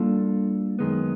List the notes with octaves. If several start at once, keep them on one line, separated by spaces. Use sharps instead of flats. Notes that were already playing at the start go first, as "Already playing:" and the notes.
Already playing: G3 A#3 D4 F4 A4
F#2 D#3 G#3 B3